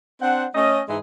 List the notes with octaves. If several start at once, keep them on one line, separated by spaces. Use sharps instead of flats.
C4 D4 C5 F#5
A3 C#4 D#5
G#2 E3 G#3 D#4 E4 G#4